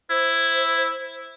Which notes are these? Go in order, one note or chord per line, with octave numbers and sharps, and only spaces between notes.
E4 C5